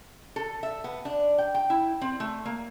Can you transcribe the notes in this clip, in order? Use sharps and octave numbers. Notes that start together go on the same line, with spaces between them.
A4
E5
B3
D4
G5
G5
E4
C4
A3
A#3